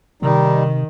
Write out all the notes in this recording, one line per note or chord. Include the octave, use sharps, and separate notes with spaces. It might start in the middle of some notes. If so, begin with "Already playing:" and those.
C3 D#3 G3 D#4